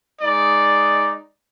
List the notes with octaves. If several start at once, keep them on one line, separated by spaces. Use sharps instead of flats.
G#3 D#4 D5